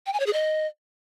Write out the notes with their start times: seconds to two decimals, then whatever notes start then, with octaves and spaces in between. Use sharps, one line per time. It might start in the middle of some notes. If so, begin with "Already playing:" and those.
0.06 G5
0.13 G#5
0.20 C#5
0.26 G#4
0.33 D#5